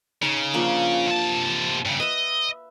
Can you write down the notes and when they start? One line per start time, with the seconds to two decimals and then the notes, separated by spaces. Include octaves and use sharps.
0.22 C#3 D#4
0.54 F3 A#3 D4
1.07 C3 A5
1.85 G2 C#3
2.00 B4 D#5 E5